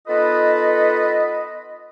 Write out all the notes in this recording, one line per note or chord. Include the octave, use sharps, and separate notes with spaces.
B3 D#4 F4 A4 B4 D#5